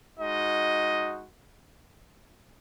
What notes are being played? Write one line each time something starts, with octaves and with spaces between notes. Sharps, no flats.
G#3 D#4 F#4 D#5